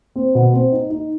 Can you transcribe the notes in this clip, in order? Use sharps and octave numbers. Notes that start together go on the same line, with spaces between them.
C4
B2
C4
D#4
D#4